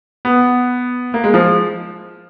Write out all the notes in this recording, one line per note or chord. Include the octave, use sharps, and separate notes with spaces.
B3
A#3
G#3
F3